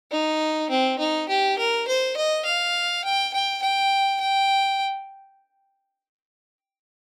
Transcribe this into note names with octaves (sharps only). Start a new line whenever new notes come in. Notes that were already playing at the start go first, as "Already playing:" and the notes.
D#4
C4
D#4
G4
A#4
C5
D#5
F5
G5
G5
G5
G5